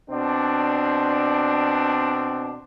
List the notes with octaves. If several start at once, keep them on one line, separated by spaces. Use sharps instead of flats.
B2 C4 D4